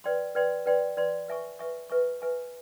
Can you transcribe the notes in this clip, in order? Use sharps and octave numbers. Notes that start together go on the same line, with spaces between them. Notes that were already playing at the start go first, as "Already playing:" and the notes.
B4 D5 G5 C6
B4 D5 G5 C6
B4 D5 G5 C6
B4 D5 G5 C6
B4 E5 G#5 C#6
B4 E5 G#5 C#6
B4 E5 G#5 C#6
B4 E5 G#5 C#6